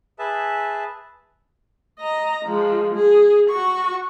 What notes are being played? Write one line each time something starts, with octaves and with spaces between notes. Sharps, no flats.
G#4 B4 E5 A5
D#5 A#5
F3 G#3
G#4
F#4 C#6